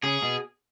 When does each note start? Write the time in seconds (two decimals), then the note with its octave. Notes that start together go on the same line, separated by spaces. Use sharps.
0.03 C#3 G#4
0.23 B2